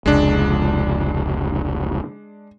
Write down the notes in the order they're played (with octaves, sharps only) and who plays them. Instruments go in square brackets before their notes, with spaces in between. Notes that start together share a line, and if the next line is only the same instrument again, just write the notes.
[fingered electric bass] F1 C#2 [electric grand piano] G#3 D4